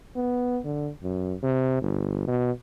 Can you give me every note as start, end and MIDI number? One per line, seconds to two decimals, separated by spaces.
0.16 0.59 59
0.65 0.90 50
1.03 1.35 42
1.43 1.78 48
1.82 2.26 31
2.28 2.51 47